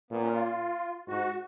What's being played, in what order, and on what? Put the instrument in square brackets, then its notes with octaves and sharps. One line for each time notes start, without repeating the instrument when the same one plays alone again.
[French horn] A#2 [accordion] B3
[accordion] C#4
F4
[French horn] G#2 [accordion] F#4